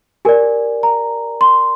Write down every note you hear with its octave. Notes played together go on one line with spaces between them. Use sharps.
G4 A#4 D5 G#5
A#5
C6